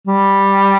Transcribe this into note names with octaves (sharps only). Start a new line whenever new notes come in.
G3